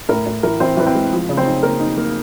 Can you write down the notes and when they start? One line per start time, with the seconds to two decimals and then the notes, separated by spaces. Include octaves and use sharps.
0.09 A2 A#4
0.26 A2
0.43 E3 A#4
0.60 E3 C4 C5
0.77 E3 B4
0.87 C4 C5
0.95 G#3
1.12 F3
1.29 C#3
1.37 C4 C5
1.46 D#4
1.63 A#3 A#4
1.80 D#4
1.97 A#3